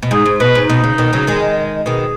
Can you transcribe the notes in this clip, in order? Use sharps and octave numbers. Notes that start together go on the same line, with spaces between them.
B2
G#2 G#4
G#2
B2 B4
G#2
B2 D#4
C#3
B2 D#3
C#3 F#3
D#3 G#3
B2 D#3 G#4